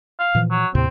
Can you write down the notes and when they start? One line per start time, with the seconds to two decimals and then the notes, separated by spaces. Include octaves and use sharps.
0.20 F5
0.35 A#2 E3 F3
0.51 F#3
0.75 D#2 A2 C3 C4